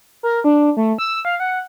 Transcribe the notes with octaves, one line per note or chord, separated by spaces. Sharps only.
A#4
D4
A3
E6
F5
F#5